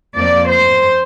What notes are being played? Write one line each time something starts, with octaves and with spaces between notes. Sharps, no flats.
F2 F3 A#3 D5
C5